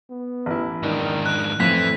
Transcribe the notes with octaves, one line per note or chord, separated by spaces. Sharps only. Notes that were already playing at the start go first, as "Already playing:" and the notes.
B3
A1 E4
G#2 D#3 D4
F#6
F2 A2 E3 B6